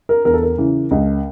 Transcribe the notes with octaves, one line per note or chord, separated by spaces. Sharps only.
A#4
E2 A#4
A4
A#4
C#3 E3
C#2